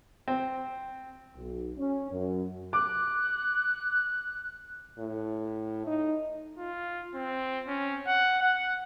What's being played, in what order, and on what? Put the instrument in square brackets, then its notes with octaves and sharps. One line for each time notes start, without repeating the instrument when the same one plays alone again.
[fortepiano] C4
[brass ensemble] B1
C#4
F#2
[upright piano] D6 [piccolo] F#6
[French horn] A2
D#4
[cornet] F4
C4
C#4
F#5
F#5